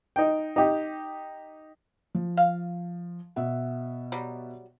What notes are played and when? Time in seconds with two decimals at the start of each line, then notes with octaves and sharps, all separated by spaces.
0.16 D#4 G5
0.56 D#4 G4
2.15 F3
2.37 F5
3.36 B2 E5 F#5
4.12 F#3 G3